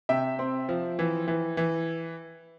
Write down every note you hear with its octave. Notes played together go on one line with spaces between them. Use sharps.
C3 E5 G5
C4
F3
E3
E3
E3